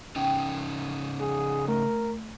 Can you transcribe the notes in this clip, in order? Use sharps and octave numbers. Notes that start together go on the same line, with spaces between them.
C#3 C#4 D#4 G5
G#4 F#5
A3 A#4